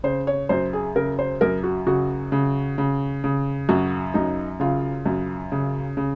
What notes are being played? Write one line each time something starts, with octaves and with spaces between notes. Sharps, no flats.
C#3 C5
C#5
F#2 C5
G#4
C#3 A#4
C5
F#2 A#4
F#4
C#3 F#4
C#3
C#3
C#3
F#2 F#4
F#2 D#4
C#3 F4
F#2
C#3
C#3